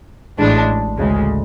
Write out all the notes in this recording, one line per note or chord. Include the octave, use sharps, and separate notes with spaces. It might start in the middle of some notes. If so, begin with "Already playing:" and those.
A1 A2 G#3 D4
D2 C#3 G#3